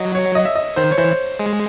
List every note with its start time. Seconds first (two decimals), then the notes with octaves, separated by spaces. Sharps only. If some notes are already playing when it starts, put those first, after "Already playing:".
Already playing: F#3 D#5
0.15 C#5
0.35 D#5
0.45 E5
0.55 D#5
0.76 D#3 C5
0.91 C#5
0.98 E3 C5
1.39 G#3